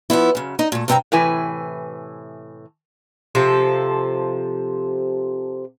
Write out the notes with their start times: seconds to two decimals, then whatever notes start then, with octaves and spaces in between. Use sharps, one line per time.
0.10 F3 F#3 B3 E4
0.35 F#2 C#3
0.59 D#4 D#5
0.72 A#2 A3
0.88 G2 C3 B3 C4 G5 A#5
1.12 A2 C3 E3 B4 G#5
3.35 C3 F3 A4